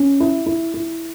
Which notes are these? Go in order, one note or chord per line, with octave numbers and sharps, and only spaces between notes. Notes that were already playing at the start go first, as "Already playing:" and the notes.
Already playing: C#4
E4
E4
E4